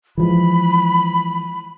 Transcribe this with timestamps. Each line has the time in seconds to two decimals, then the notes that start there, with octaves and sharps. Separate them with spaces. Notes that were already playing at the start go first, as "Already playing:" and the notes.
0.18 E3 F3 G#3 B5